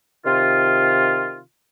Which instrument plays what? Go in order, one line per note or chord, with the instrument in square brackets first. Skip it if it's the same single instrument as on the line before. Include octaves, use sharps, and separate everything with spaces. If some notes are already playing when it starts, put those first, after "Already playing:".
[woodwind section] C3 D#3 F4